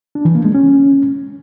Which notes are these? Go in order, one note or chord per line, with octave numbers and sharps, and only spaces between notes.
D4
E3
A#3
G#3
C#4